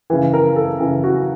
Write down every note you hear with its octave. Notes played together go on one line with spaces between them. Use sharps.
C#3 E3
A#4
A4
C#3 E3
F#4